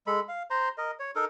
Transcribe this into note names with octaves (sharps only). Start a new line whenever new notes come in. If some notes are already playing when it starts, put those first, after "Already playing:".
G#3 A4 B5
F5
C5 A#5 C6
A#4 D#5
C#5
D#4 A4 A#4